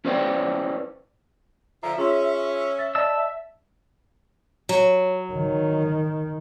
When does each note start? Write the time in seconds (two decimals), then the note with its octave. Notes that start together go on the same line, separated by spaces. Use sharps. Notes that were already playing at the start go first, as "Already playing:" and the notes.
0.05 C#4 E4 B4 C5 D5 G5
1.83 D3 F3 E5 A#5
1.97 C#4 F4 G#4 C6
2.79 A6
2.95 D5 D#5 A5 E6
4.69 F#3
5.33 D#3